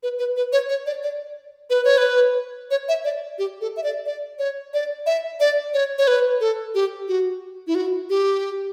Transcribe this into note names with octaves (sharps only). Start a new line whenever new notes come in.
B4
B4
B4
C#5
C#5
D5
D5
B4
C#5
B4
C#5
E5
D5
G4
A4
E5
D5
D5
C#5
D5
E5
D5
C#5
C#5
B4
A4
G4
F#4
E4
F#4
G4